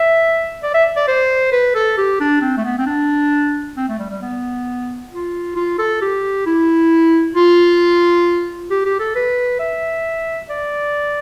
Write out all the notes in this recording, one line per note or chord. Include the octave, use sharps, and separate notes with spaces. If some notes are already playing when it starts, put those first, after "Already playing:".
Already playing: E5
D5
E5
D5
C5
B4
A4
G4
D4
C4
A3
B3
C4
D4
C4
A3
G3
G3
B3
F4
F4
A4
G4
E4
F4
G4
G4
A4
B4
E5
D5